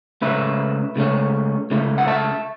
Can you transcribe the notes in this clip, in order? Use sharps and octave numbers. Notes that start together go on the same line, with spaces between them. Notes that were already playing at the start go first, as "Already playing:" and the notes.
C#2 C#3 A3 C#4 B4 E5
C#2 C#3 A3 C#4
C#2 C#3 A3 E4
F#5
E5 A5